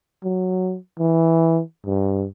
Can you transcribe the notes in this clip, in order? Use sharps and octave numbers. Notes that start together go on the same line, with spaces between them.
F#3
E3
G2